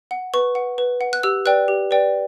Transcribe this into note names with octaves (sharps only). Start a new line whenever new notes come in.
F#5
B4 C#6
F#5
B4
F#5
F#6
G4 E6
B4 D5 G5 F#6
G4
B4 D5 G5